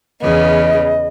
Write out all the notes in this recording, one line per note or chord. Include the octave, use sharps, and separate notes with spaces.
E2 C#3 B3 D#5